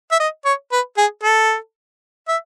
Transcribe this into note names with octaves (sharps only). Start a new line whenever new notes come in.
E5
D#5
C#5
B4
G#4
A4
E5